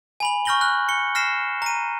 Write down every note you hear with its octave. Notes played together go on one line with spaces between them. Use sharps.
G#5 B5 F#7
C#6 F6 G6 A#6 F#7 G7
F6 F#6
C#7 G7
F6 A#6 C7 E7
A#5 D#7